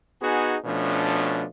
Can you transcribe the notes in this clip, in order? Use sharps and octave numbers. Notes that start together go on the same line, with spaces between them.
B3 D#4 F#4 G#4
B2 F3 A3 C#4 D4